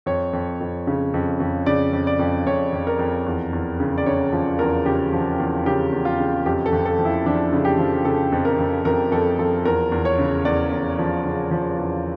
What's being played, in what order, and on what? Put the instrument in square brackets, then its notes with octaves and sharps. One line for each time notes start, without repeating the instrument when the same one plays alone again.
[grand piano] F2 C#5
F2
F2
C#3
F2
F2
C#3 D5
F2
D5
F2
F2 C#5
F2
A#4
F2
E2
E2
C#3
D5
C#3 C#5
F3
E2 A#4
C#3 G4
F3
E2
C#3 G4
E2
F4
C#3
F2 G4
A4
F2
A4
F3
E4
F3 D4
C#3
G4
F3
C#3 A4
F2
A#4
F2
F2 A#4
F2 A4
F3 A4
E2 A#4
E2
C#5
C#3
E2 D5
E2
F3
C#3
F3
E2